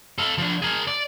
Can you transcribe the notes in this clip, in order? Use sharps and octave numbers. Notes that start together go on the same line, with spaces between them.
A4 F5
F3 D4
G#4 A#4
D5